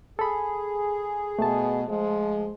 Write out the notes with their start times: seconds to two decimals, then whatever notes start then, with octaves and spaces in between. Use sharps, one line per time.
0.19 G#4 A4 B5
1.39 B2 A3 A5
1.87 F3 G#3